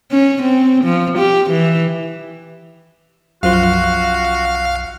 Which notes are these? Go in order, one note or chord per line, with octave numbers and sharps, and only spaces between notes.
C#4
C4
F3
G4
E3
B1 F#2 F3 F#4 F5 C6